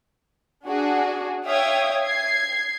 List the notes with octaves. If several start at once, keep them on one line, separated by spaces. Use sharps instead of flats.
D4 F#4 G#4
C#5 E5 F5 G5 D#6 G#6
G#6 C7